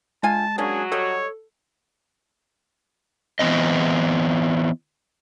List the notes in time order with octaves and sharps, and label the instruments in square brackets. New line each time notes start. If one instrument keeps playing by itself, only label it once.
[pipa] D3 F4 G#5 [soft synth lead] G#3 [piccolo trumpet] A5
[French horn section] F#3 F#4 [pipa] A#3 C#4 D4 [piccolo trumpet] G#4
[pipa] G3 D#5 [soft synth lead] A4 [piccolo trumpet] C#5
[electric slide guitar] E3 F3 B3 C4 D#5